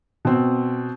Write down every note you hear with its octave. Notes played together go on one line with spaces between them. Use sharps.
B2 C4